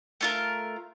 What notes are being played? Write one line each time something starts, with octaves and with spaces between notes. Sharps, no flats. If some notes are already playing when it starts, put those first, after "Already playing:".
A3 F4 A#4